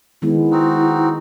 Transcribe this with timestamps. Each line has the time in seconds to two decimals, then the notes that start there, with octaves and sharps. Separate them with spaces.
0.22 D#3 G#3 B3 E4
0.51 C4 D#4 F#4